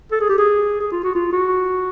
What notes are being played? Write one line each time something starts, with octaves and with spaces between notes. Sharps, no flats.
A4
G#4
G4
G#4
G#4
F4
F#4
F4
F#4